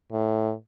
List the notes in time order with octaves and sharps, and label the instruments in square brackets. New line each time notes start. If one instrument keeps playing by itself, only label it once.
[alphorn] A2